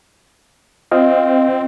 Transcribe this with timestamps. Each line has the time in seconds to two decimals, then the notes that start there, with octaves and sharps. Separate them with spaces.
0.91 C4 F4 D#5 F5